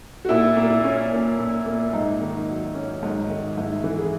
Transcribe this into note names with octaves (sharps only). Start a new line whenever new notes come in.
F#4
A#2 E4
A#3
E4
C#4
A#2
A#2
A#3
G#2 D#4
D#3
F#3
C#4
G#2
D#3
G#2 E4
E3
G#4